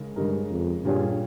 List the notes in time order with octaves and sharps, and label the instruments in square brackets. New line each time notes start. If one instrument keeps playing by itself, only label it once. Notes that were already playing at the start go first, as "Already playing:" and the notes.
Already playing: [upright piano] C#3 G#3 D#4 A#4
[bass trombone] G2 [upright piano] C#3 G#3 D#4 A#4
[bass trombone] F2
[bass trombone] G2 [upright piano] A#2 G3 C#4 G#4